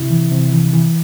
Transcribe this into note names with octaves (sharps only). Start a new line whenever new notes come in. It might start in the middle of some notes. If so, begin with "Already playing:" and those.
Already playing: C3 E4
E3
C3
E3
E3